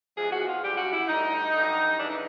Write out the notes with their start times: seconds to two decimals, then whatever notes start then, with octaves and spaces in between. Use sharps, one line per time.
0.16 E2 C3 F3 G#3 G#4
0.31 F#4
0.47 F4
0.62 F#2 D3 G3 G4
0.77 F#4
0.92 E4
1.07 D2 D3 G3 D#4
1.53 G2 D3 F#3
1.98 F#2 C#3 E3 G3 D4
2.09 D#4